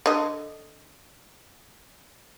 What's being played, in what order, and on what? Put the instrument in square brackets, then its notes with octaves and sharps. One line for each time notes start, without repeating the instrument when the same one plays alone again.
[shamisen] D3 D#5